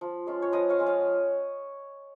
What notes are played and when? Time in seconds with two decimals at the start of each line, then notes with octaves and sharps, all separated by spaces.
0.01 F3
0.27 G#3 C#4 F4
0.42 C#5
0.52 F3 B4 D#5
0.69 C#5 F5
0.79 G#3 C#4 F4
0.86 C#5 F5